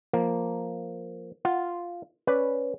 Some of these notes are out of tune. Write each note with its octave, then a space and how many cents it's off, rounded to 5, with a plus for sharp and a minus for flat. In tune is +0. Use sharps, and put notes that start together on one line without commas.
F3 +0 A#3 +0
F4 +0 F#5 +0
C#4 +0 B4 +0 D5 +0